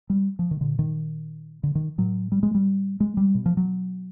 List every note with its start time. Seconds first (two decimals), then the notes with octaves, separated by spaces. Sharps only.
0.10 G3
0.39 F3
0.51 D#3
0.61 A#2 D3
0.79 D#3
1.63 D3
1.75 D#3
1.98 A2 F#3
2.32 G3
2.43 G#3
2.55 G3
3.00 G#3
3.17 G3
3.35 B2
3.46 F3
3.57 F#3